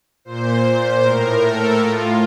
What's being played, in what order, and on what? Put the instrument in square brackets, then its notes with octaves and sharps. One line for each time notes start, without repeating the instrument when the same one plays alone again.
[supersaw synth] A#2 C5
A2 A#4
A4
A2 F4